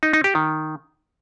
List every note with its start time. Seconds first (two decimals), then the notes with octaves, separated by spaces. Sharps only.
0.03 D#4
0.13 D#4
0.24 G4
0.35 D#3